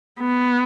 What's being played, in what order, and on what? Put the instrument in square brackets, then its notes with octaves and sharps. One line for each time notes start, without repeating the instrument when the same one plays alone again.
[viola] B3